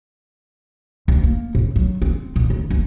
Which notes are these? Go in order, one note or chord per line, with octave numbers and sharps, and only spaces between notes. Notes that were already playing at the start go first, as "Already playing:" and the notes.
D2
A#3
A2
F#3
C4
A#2
D2
F#1